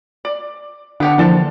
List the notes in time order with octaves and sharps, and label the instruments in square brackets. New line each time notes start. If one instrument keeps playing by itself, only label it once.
[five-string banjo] D5
[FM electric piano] D3 F#5 [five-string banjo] B3 G4 C#5 [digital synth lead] D4
[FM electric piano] D3 E3 A#3 [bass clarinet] F3 [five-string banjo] G3 A4 A5 [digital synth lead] D4